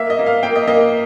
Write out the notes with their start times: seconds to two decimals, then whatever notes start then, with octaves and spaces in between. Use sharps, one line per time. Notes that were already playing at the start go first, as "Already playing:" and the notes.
Already playing: A#3 E5
0.10 D#5
0.19 A#3
0.26 F5
0.43 A#3 G5
0.56 D#5
0.67 A#3 D#5